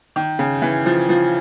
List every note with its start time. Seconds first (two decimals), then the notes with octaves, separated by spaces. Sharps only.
0.16 D#3
0.39 C#3
0.62 E3
0.86 F3
1.09 F3